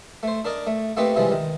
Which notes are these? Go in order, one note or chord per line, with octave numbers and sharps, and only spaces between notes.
A3 C5
D4 A#4 D5 D#5
A3
A3 A#3 C4 D#4 G4 B4
C3 E3 F3 G3 G#3
D#3